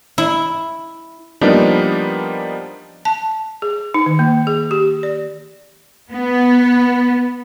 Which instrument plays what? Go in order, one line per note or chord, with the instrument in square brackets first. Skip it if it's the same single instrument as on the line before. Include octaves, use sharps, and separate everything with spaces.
[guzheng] E4
[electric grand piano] F3 G3 A#3 B3 D4 D#4
[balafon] A5
G#4
D#4
D#3
A#3
G#4
G4
D5
[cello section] B3